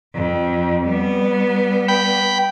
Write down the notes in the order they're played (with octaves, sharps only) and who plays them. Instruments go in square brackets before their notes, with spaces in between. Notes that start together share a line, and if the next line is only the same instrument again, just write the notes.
[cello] F2
G3 B3
[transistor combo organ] G5 B5